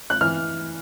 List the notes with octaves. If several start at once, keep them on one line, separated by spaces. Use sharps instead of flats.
F#6
E3 F6